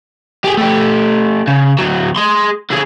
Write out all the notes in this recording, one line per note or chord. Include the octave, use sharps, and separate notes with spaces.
G4 G#4
A3 G4
C#3
D2 F#3
G#4 C6
D3 G#4